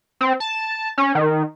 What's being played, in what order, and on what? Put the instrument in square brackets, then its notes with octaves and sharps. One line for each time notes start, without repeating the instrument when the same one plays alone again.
[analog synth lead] C4
A5
C#4
D#3